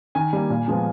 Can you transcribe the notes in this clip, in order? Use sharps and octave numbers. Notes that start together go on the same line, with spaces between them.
D#3 G#5
G3 A#3
A#2
F3 G#3 B3